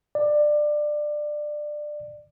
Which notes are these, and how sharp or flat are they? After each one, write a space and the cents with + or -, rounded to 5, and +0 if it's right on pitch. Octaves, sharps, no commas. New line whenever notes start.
D5 +20